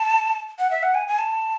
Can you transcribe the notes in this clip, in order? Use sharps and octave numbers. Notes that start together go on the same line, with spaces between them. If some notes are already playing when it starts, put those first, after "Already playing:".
Already playing: A5
F#5
E5
F#5
G#5
G#5
A5